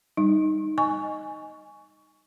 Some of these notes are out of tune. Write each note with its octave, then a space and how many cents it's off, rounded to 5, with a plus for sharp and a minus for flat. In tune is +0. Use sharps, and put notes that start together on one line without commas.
G3 +20 D#4 +0
D#5 +0 G#5 +0 C#6 +15